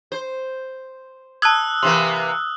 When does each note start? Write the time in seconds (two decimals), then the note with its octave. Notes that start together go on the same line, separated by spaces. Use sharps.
0.12 C5
1.42 A5 D#6 E6 F#6 G#6
1.83 C3 E3 A#3 C6